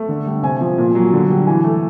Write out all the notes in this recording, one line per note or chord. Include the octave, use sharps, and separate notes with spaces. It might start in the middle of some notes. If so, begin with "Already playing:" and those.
Already playing: A3
D3
G3
C3 G#5
F3
A#2
F#3
D3
G3
E3 G#5
A3